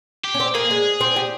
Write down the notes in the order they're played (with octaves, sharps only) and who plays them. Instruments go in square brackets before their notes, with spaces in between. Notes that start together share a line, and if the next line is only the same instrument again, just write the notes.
[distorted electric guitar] G4
[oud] C#4
C4
[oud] A#3 [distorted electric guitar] G#4
[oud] G#3
C4
G4